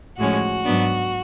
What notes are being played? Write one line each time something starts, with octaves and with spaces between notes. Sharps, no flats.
A2 F3 G#3 C#4 F#4
G#2 F#3 B3 D4